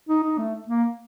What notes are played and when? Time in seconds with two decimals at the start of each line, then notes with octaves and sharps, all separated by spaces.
0.09 D#4
0.23 D#4
0.38 A3
0.68 A#3